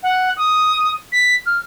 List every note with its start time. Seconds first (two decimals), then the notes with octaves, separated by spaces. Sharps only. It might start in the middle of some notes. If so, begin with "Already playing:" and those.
0.03 F#5
0.37 D#6
1.12 B6
1.46 F6